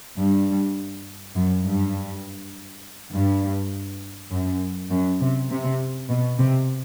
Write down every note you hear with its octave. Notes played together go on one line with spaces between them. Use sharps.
G2
F#2
G2
G2
F#2
F#2
C3
C3
B2
C3